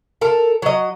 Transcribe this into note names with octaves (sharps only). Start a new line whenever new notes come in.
A4 A#4
F#3 D#5